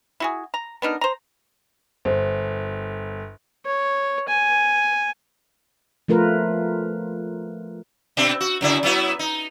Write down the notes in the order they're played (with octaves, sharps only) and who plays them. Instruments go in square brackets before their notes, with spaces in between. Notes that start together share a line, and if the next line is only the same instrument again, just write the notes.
[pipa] E4 F#4 G#4
A#5
B3 D4 D#4 A#4
C5 A#5
[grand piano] G1 [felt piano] C5
[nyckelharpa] C#5
G#5
[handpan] F3 A3 F4 A#4 B4
[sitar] B2 C4 D4
F#4
F#2 C#3 E4
F#3 B3 E4
D#4